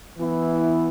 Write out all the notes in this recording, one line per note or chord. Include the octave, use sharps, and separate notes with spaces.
E3 B3 E4